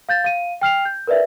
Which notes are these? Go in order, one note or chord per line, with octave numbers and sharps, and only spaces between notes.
F5 G6 A6
F5 D#7
G5 F6 C7 F7
G6
A#4 B4 D5 E5